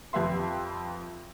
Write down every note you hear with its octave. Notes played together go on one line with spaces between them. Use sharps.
F2 G4 B4 E5 C6